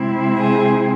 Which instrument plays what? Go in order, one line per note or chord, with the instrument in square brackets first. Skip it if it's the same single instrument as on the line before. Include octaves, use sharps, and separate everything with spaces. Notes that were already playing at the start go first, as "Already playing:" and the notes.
Already playing: [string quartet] C3 G#3 C4 E4
G#4